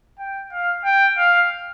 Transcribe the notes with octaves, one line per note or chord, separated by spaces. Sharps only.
G5
F5
G5
F5